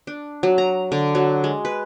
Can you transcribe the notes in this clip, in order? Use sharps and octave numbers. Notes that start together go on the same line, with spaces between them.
D4
F#3
A#5
D3
F#3
G#3
B4